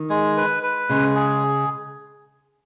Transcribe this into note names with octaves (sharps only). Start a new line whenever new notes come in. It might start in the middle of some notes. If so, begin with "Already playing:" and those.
Already playing: D#3
G#3
B4
B4
C#3 G#3
G#4